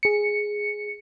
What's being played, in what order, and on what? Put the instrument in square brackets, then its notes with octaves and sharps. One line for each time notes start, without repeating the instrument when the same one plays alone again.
[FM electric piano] G#4 C#7